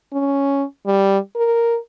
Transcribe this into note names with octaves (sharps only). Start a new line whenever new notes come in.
C#4
G3
A#4